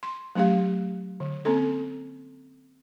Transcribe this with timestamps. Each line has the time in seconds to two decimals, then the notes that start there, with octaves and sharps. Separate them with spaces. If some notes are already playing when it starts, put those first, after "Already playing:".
0.03 C6
0.35 F#3 A3 C#4 G4 F5
1.20 D3
1.45 A#3 C4 C#4 A4